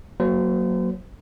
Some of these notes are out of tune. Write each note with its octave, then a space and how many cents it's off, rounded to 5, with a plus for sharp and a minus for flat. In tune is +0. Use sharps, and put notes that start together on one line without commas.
F#3 +0 A#3 +0 C5 -40